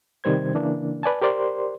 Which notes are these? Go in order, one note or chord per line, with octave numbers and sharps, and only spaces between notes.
C3 D#3 G3 C5 G#6
C#3 E3 A#3 D4
B4 D5 G#5 A5
G4 A#4 C5 D5 C6